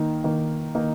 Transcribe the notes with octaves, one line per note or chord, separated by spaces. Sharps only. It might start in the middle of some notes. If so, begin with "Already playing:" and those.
Already playing: D#3 A#3 D#4
D#3 A#3 D#4
D#3 A#3 D#4